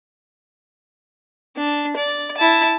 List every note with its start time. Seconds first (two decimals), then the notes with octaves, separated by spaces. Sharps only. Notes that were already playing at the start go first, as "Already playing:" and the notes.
1.56 D4
1.97 D5
2.37 E4 A5